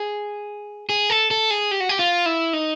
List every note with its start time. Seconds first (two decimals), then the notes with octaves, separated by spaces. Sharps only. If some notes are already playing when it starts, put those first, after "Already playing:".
Already playing: G#4
0.89 G#4
1.10 A4
1.31 A4
1.51 G#4
1.71 G4
1.80 F#4
1.89 G4
1.99 F4
2.26 E4
2.53 D#4